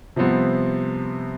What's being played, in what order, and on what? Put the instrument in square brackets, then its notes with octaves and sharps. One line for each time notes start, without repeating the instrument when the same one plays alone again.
[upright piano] C3 F3 G3 B3 C4